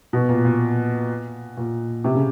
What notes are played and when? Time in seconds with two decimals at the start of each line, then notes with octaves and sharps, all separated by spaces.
0.13 B2
0.29 A#2
0.45 A#2
1.57 A#2
2.04 C3
2.15 C#3